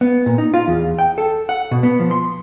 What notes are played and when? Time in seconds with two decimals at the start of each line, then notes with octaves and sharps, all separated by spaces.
0.01 B3
0.26 A#2
0.38 D#4
0.54 F4
0.68 E2
0.99 G5
1.18 A4
1.49 F#5
1.71 B2
1.83 B3
1.99 F3
2.11 C6